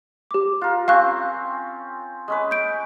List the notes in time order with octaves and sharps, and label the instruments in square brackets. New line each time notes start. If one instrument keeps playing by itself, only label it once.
[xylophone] G4 D6
[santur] F4 A#4 [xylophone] F#6
[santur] C4 C#4 [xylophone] F5 C#6 F#6
[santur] G#3 C#4 B4
[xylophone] G6 D7